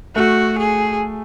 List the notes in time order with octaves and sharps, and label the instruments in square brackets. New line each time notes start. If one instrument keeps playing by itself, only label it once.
[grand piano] A3 [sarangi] F#4
[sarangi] G#4